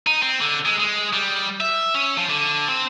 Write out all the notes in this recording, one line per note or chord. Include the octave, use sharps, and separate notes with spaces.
D#4
C4
D3
G#3
G#3
G3
E5
C#4
F3
D3
C4